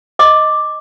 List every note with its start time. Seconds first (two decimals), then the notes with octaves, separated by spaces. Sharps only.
0.19 D#5 D6